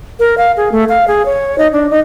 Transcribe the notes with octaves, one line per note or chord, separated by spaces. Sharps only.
A#4
F5
G#4
A3
F5
G#4
C#5
D#4
D4
D#4